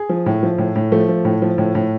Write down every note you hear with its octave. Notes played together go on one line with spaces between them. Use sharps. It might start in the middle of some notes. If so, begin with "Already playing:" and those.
Already playing: G#4
F3
A2
F3
A2
A2
F3 A3
F3
A2
F3
A2
A2